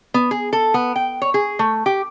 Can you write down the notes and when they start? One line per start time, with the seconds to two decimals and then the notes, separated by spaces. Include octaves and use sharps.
0.14 B3
0.31 G#4
0.53 A4
0.74 B3
0.96 G5
1.22 C#5
1.34 G#4
1.59 A3
1.86 G4